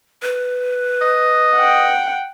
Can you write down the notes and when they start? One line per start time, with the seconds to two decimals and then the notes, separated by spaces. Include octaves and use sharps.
0.22 B4
1.01 D#5
1.56 F#5 G5